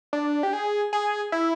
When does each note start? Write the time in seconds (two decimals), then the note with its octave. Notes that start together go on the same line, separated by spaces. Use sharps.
0.13 D4
0.43 G4
0.53 G#4
0.93 G#4
1.32 E4